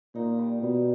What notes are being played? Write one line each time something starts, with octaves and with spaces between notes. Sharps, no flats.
A#2 D#4
G3
B2 G3